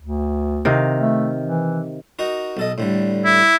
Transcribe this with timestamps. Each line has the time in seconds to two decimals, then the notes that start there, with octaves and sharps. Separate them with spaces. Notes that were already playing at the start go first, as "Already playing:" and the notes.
0.01 D2
0.65 C3 D#3 F5
0.98 A3
1.43 E3
2.19 D#4 F#4 A#4
2.57 B1 A4 D#5
2.78 A2 D3 G3
3.24 E4